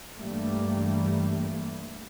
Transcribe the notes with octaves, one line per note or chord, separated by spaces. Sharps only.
G2 E3 G3 A3 A#3